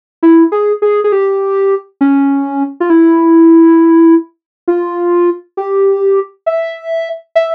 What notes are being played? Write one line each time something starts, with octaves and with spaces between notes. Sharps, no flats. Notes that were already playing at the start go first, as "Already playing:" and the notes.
E4
G#4
G#4
G#4
G4
C#4
F4
E4
F4
G4
E5
E5